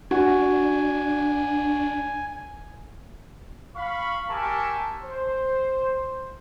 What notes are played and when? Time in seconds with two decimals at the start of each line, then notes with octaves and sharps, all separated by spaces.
0.11 D4 F#4 G#5
3.76 F5 B5 C#6
4.29 G4 A#4 E5 G#5 A5 C#6
5.02 C5